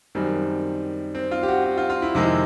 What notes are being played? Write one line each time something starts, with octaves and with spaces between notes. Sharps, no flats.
F#2 D#3 G3 C4
C4
F4
G4
F#4
F#4
F4
F4
E4
F2 C3 D#3 G#3 E4